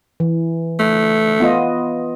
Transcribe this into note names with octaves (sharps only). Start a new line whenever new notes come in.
E3
A3
B3 F4 D#5